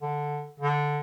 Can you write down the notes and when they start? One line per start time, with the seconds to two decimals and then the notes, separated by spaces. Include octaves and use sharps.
0.02 D3
0.59 D3